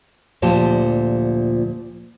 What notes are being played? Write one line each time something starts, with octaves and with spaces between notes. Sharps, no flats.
D2 A#2 F3 G4 A5